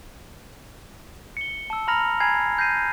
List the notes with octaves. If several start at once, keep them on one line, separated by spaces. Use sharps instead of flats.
C#7 G7
A5 E6
A#5 B5 F6 A#6 F7
G#5 A#5 B5 G#6 C7
G6 A#6 C7 D#7